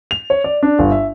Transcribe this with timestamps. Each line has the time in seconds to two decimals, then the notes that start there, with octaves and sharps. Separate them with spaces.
0.11 F7
0.30 C#5
0.44 D5
0.63 D4
0.79 G1
0.92 E5